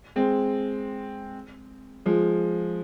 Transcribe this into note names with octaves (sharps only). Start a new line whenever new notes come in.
G#3 C4
F3 G#3